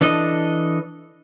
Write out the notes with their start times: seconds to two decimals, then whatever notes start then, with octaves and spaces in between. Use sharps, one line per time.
0.01 E3 D4 A4 D#5